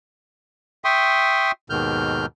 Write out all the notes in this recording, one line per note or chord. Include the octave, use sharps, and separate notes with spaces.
E5 G5 C6 C#6 D#6
D#2 G#2 B2 D#3 F6 G6